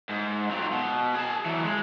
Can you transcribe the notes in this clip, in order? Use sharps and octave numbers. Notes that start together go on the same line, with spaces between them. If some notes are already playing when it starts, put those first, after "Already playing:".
G#2
F2 F#3
B2
G#4 A5
E3 F#3
G#3